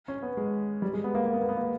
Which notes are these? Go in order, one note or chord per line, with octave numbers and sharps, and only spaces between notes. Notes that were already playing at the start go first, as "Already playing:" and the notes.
C#4
B3
G#3
G3
G#3
B3
A#3
A#3
B3
A#3
B3
A#3